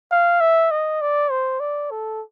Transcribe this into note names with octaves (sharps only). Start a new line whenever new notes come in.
F5
E5
D#5
D5
C5
D5
A4